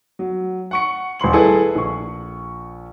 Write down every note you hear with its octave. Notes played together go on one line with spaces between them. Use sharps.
F#3
F#5 C#6 C#7
D#1 B5 C6 F#7
E4 G#4 A4 B4
A#1 C#6